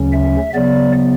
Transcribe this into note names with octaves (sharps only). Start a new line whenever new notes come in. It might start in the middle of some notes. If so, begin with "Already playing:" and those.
Already playing: D2 C#3 F#3 C#4
E5
C#3 F#3 B3 D5